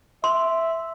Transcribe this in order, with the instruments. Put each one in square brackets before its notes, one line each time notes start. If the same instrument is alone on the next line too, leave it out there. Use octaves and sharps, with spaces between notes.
[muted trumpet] E5 [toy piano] C6